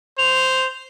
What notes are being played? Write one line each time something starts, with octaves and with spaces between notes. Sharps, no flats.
C5 F7